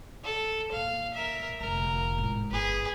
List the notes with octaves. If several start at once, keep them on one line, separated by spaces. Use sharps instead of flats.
A4
E2 A#2 F5
A#4 E5
F1 D3 A#4
A1 G#2
G1 G#4 B4